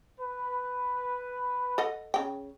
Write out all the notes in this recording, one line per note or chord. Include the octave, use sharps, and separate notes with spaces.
B4
A4 D#5 F#5
C#3 G5